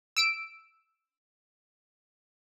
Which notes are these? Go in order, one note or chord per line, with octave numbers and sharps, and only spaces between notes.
E6 D7